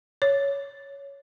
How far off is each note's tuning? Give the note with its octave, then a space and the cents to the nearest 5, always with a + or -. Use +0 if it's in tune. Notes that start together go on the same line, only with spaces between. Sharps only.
C#5 +10